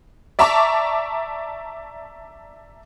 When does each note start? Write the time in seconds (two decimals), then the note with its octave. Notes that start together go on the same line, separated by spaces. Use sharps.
0.39 D5 E5 A5 A#5 C#6 D6